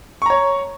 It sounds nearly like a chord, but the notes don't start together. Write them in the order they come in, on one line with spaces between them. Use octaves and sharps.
C#6 A#5 C#5